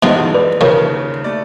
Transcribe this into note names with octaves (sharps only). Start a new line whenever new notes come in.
A1 F#2 B2 D#3 F3 G#3
B4 D5
F#1 D#2 C#3 F3 A#4 C#5 G5
A3 D5